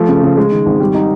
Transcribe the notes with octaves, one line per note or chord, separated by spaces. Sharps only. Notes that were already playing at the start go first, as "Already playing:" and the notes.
Already playing: F3 A3
C#3
C#3
G#3
D#3
G#1
G3
D#4